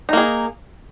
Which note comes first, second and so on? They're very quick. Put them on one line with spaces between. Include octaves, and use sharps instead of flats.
D#4 A#3 G#4